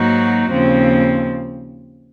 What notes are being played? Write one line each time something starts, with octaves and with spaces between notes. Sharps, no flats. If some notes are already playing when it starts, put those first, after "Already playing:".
Already playing: G#2 F#3 A#3 D#4 F#4
D#2 C#3 F3 C4